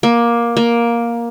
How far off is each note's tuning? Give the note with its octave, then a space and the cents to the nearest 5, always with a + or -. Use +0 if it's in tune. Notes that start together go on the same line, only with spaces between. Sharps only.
A#3 +15
A#3 +10